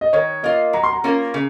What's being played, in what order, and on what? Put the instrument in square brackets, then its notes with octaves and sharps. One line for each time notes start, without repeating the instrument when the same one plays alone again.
[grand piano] D#5
[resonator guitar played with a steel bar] D#3 [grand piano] C#5
[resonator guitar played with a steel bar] A#3 F4 [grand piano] D#5
[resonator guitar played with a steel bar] F#3 [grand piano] A#5
[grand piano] C6
A#5
[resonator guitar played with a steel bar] A#3 C#4 F4 A#4
C#3